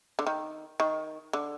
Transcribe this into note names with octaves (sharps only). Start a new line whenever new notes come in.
D3
D#3
D#3
D3